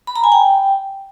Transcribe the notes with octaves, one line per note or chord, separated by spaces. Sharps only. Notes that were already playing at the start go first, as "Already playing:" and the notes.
B5
A#5
G#5
G5